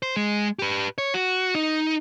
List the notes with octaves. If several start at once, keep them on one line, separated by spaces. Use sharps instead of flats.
C5
G#3
G4 B4
C#5
F#4
D#4